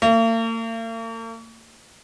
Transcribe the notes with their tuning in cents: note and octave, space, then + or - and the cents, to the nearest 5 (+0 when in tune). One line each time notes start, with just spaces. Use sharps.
A#3 -45